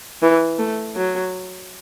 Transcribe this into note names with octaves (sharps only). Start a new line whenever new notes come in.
E3
A3
F#3